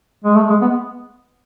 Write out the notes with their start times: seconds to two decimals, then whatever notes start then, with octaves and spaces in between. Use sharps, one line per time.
0.24 G#3
0.36 A3
0.50 G#3
0.62 B3